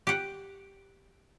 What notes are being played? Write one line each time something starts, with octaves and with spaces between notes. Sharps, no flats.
G4 F#5